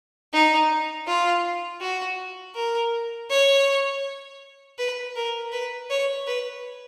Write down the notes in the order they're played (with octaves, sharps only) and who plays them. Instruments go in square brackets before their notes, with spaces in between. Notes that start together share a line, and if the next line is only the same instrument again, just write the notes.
[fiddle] D#4
F4
F#4
A#4
C#5
B4
A#4
B4
C#5
B4